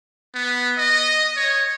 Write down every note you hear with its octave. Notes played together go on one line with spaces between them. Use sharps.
B3
D#5
C#5